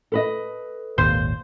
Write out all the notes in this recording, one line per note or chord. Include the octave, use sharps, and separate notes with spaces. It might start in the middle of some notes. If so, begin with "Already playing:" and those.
A4 B4 D#5
G#1 D#2 A#2 C5